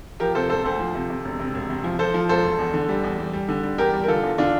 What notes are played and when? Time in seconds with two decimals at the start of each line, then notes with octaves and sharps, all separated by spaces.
0.20 F3 G4 A#4
0.35 C3 A4 C5
0.50 E1 A4 C5
0.64 D2 A4 C5
0.80 F3
0.95 C3
1.10 C3
1.25 E1
1.39 C3
1.54 E1
1.69 C3
1.84 F3
1.99 F3 A4 C5
2.14 F3
2.29 E1 A4 C5
2.44 E1
2.59 E2
2.74 D3
2.89 G3
3.04 E2
3.18 G3
3.33 G3
3.48 D3
3.63 G3
3.78 E2 G4 A#4
3.93 G3
4.03 A#4
4.08 D3 F4 A4
4.23 E2
4.38 D3 D4 F4